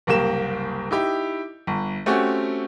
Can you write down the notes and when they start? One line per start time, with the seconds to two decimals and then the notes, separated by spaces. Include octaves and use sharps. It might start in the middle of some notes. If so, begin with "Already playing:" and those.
0.07 F#1 C2 A#3 G4 E7
0.91 D#4 E4 G4
1.67 G1
2.06 A3 C4 C#4 F#4 G4